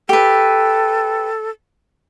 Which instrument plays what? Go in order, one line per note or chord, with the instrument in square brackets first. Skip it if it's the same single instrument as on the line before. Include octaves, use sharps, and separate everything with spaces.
[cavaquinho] G4 B4 [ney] A4